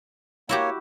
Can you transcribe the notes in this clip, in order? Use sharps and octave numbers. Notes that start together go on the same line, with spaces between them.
A#3 E4 F#4 G4 C#5